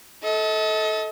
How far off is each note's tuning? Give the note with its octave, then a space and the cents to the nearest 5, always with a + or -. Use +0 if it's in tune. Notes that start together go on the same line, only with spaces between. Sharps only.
A4 -10 D#5 +40